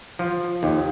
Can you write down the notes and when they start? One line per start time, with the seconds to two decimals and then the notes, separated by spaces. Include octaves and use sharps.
0.19 F3
0.63 D#2